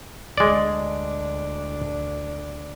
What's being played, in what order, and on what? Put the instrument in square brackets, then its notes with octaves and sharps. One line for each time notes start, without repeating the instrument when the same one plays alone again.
[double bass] D2 D4 [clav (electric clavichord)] G#3 D5